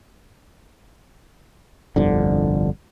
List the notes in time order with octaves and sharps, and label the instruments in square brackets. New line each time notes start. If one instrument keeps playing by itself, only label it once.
[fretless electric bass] G1 C2 F2 D3